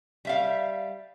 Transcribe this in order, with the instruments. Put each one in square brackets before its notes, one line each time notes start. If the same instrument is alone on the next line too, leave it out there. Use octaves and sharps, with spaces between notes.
[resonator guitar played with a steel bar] G3 E5 F5